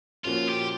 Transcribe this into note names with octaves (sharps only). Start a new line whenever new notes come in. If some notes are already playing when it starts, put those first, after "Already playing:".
A#2 F3 A#3 C#4 F4 F#4
G4